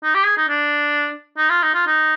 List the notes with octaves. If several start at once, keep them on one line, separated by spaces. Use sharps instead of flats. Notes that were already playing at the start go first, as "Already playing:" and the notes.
D#4
G4
G#4
D#4
D4
D#4
F4
D#4
F4
D#4